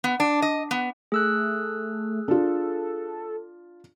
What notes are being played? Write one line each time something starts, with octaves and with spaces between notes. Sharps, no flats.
B3
D4
D#5
B3
A3 G#4 E6 F#6
D4 F4 A4